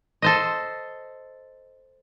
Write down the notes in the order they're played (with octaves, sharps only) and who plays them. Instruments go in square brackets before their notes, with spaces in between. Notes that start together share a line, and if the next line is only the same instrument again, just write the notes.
[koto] A4 C5 D#5